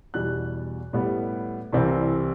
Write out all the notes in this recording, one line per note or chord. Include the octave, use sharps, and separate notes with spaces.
E2 B2 G3 F#6
A2 G3 B3
C2 C3 E3 G3 C4